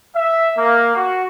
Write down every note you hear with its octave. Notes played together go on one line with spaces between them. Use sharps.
E5
A#3
F#4